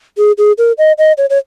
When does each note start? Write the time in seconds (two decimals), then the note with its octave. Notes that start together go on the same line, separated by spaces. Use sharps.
0.18 G#4
0.38 G#4
0.58 A#4
0.78 D#5
0.98 D#5
1.18 C#5
1.30 C#5